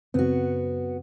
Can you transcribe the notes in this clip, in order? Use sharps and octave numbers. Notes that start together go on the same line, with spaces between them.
F#2 C#3 B3 C4 F#4